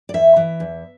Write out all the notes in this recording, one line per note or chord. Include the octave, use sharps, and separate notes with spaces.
D5
E2 E5
E3
E2